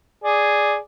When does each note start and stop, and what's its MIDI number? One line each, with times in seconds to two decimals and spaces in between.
0.24 0.76 68
0.24 0.76 74